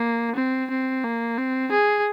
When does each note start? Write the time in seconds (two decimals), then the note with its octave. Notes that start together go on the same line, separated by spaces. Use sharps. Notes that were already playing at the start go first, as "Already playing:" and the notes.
Already playing: A#3
0.36 C4
0.70 C4
1.04 A#3
1.38 C4
1.71 G#4